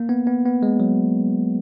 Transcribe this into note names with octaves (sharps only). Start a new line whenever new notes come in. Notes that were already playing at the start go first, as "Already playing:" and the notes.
Already playing: A#3
B3
B3
B3
G#3
F#3